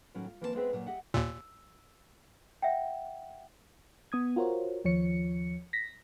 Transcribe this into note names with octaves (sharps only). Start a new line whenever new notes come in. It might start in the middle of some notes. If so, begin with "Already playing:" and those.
A2 D#3 F#3 C#4
F4
E3 F3 A#3 C4 C#5 A5
G#3 B3 C4 G#4 B4 E5
A#2 F#3
G4 D#5 E5 F#5
D#2 A#2 E6
E5 F#5 G5
B3 D#6 G#6
F4 F#4 A#4 C5 C#5
D#2 F3 C#5 C#7
A#6 B6